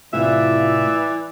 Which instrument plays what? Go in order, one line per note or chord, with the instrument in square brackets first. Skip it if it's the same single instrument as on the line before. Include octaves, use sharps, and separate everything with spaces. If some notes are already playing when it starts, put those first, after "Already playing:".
[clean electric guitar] C2 A2 F4 [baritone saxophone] E3 [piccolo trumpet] D5 [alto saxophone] E5